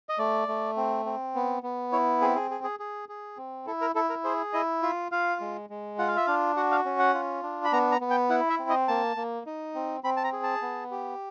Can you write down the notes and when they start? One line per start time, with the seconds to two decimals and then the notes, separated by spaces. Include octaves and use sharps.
0.09 D#5
0.19 A3 D5
0.48 A3
0.77 C4
1.05 C4
1.35 B3
1.63 B3
1.92 E4 C#5
2.22 C4 G#4
2.36 G#4
2.51 G#4
2.64 G#4
2.80 G#4
3.09 G#4
3.37 C4
3.67 E4 A4
3.81 A#4
3.95 E4 A4
4.10 A#4
4.24 G#4 C5
4.53 E4 D#5
4.82 F4 E5
5.12 F4 F5
5.41 G#3
5.70 G#3
5.98 F4 F#5
6.08 F5
6.17 E5
6.26 D4 F5
6.57 F#4 F#5
6.71 F5
6.85 C#4
6.99 F#5
7.14 F4
7.43 D4
7.65 B5
7.73 B3 A#5
7.92 A#5
8.01 B3
8.10 G5
8.30 E4 F#5
8.50 E5
8.59 C4
8.69 D#5
8.88 A#3 A5
9.17 A#3
9.46 D#4
9.75 C4
10.04 C4 B5
10.17 A5
10.24 A#5
10.33 G#4
10.43 A5
10.62 B3
10.91 G4